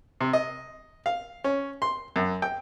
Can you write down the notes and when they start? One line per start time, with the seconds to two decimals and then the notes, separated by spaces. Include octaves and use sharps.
0.21 C3
0.33 D#5
1.06 F5
1.44 C#4
1.82 C6
2.16 F#2
2.42 G5